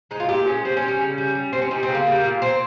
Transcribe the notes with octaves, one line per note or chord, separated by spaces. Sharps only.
G#3 D#4
F4
A#2 G4
G#3 C#4
G3 C4
C#4
G3
C#4
C#3
G3
G3
G3 C4
C#4
G3 D#4
C4
C#3
A#3
G3
A#2
A#2 C4